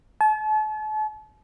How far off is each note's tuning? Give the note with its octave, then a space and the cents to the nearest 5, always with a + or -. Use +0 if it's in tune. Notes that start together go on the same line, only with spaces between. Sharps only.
A5 -40